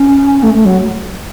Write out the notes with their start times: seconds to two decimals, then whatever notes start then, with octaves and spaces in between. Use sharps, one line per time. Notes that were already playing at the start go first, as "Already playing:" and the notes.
Already playing: C#4
0.43 A3
0.54 A3
0.65 F#3